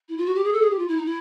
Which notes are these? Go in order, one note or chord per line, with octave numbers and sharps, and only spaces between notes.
E4
F4
F#4
G4
G#4
A4
G#4
G4
F4
E4
D#4
E4